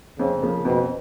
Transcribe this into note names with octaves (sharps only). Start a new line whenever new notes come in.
F2 C#3
C#3 F3 A#3
F2 B2